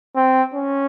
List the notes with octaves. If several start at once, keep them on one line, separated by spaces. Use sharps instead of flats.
C4
C#4